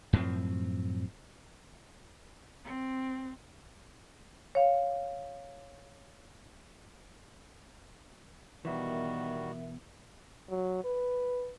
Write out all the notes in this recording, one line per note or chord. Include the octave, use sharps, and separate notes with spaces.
F#2 A2 F3 C4
C4
C#5 F5
B2 D#3 E3 G3 B3 F#4 A#4 E5
F#3
B4